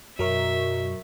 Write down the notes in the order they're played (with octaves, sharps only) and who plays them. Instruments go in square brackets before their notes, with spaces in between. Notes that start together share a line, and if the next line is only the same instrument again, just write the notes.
[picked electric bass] F#2 [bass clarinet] B2 [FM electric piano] F#3 A#4 C#6 [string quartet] E5